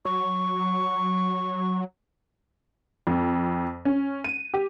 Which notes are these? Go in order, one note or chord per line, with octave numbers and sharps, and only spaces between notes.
F#3 C#6
F2
C#4
D#7
G4